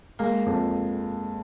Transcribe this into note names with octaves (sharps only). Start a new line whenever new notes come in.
G#3 A#3
F2